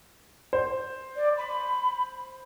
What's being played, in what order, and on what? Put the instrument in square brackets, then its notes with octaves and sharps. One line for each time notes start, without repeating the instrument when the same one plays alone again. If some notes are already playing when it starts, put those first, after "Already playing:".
[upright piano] C5
[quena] D5
B5